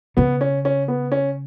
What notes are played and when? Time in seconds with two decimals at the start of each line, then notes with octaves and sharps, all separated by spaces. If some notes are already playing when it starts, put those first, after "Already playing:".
0.17 C#3 B3
0.41 C#4
0.65 C#4
0.88 B3
1.12 C#4